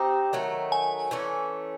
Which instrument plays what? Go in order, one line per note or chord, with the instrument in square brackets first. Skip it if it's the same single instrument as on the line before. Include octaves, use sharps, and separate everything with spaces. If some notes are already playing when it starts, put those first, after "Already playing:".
Already playing: [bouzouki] C4 D#4 G4 [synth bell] A#5
[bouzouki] D#3 F#3 A3
[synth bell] G#5
[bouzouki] E3 A3 C#4